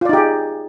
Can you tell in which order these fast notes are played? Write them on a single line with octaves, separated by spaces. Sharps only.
F4 D5 D#4 G4 G#4